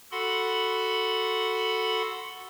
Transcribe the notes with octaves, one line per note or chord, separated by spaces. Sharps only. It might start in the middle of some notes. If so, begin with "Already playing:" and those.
F#4 A4 F#5 B5 C6